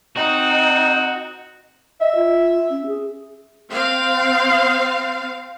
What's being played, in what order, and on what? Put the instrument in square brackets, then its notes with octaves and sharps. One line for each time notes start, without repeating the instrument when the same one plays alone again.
[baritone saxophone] C4 [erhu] D#4 [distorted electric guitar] F#4
[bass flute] D#5 [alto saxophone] E5
[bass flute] F4
C#4
G#4
[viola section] C4 F5